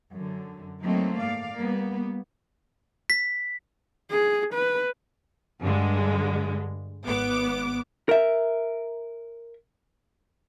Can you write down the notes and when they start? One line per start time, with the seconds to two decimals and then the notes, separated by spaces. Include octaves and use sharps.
0.13 F#2 D3
0.82 F#3 A3 A#3 C4 D#4
1.18 G#2 D5 F5
1.55 G3 A#3 B3
3.10 B6
4.11 G#4
4.54 B4
5.62 G2 D3 G#3
7.06 G#1 B3 D6
8.09 A#4 E5